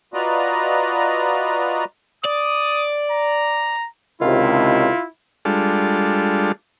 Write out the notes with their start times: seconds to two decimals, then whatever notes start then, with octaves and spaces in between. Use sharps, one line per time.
0.14 F4 F#4 B4 D5 D#5 A#5
2.25 D5 D#6
3.12 A#5
4.21 C#2 C3 D#3 E4 F4
5.45 G3 G#3 D4 F4 A4